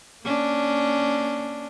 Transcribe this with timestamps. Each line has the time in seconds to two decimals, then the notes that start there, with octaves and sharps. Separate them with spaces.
0.23 A#3 C#4 D4